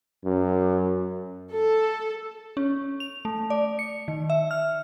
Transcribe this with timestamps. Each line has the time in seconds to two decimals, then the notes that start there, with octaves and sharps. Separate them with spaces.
0.25 F#2
1.53 A4
2.57 C#4
3.00 F7
3.25 A3
3.50 D5
3.79 C#7
4.08 D#3
4.30 E5
4.51 F6